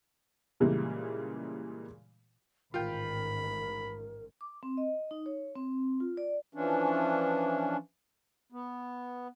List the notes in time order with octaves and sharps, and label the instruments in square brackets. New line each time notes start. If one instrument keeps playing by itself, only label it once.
[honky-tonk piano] A#2 C#3 E3 G3 G#3 A#3
[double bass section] A1 G#2 D#3 [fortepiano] F4 G5 [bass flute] A#4 [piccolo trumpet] B5
[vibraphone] D6
C4
D#5
D#4
C#5
C4
F4
D5
[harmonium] E3 F3 C#4 D4
B3